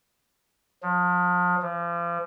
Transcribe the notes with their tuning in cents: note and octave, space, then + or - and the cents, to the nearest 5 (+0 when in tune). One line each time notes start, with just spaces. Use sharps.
F3 +35
F3 -35